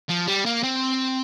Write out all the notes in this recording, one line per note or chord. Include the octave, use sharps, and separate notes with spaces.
F3
G3
A#3
C4